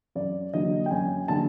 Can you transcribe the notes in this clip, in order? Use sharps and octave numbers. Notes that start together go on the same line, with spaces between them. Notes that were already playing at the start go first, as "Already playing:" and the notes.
F#2 D5
D3 F#3 A#3 D#5
G5
F#2 G#5
D3 F#3 A#3 A5